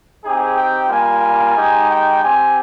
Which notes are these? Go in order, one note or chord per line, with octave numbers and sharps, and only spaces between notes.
C4 D#4 G4 G#4
G5
G3 A#3 F4 G#5
G#3 D#4 G4
G5
C4 G4 G#5